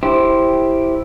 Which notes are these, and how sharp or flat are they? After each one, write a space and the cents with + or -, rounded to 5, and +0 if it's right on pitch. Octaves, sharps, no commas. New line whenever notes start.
E4 +0 G4 +0 C5 +5